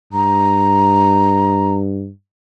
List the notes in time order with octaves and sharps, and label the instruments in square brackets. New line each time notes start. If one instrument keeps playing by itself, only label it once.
[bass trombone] G2 [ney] A#5